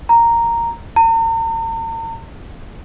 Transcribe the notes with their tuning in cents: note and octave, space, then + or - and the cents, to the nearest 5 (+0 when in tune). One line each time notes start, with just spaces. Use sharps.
A#5 -5
A#5 -45